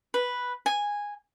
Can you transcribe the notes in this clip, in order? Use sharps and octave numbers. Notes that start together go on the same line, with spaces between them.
B4
G#5